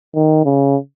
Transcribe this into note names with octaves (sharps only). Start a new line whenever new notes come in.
D#3
C#3